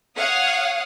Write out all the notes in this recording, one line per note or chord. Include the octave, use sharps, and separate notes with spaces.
C#5 F5 F#5 D#6